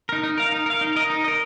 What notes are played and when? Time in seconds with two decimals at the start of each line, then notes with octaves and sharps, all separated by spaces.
0.09 D#4 A#4
0.23 D#4
0.38 A#4 F5
0.52 D#4
0.66 A#4 F5
0.81 D#4
0.96 A#4 D#5
1.10 D#4
1.24 A#4 D#5